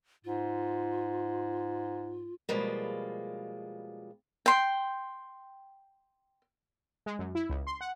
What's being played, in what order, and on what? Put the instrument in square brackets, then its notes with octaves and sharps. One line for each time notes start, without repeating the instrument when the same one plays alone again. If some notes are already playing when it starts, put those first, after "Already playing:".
[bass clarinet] G#2 [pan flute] F4
[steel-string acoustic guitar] B2 F3 G3 G#3 A#3
[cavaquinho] G5 C6
[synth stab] G#3
F#2
E4
C#2
C6
F#5